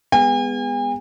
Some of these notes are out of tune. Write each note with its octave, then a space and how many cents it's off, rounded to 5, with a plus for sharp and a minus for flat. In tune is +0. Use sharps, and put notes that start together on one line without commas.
G#3 -30 B3 +0 G#5 -45